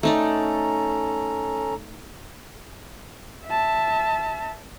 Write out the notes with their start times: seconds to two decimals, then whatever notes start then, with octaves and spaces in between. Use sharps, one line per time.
0.03 A3 C#4 D#4 A4 D5 A#5
3.47 E5 A5